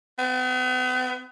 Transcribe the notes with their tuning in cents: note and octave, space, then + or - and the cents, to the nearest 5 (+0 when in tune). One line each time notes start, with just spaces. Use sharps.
B3 +40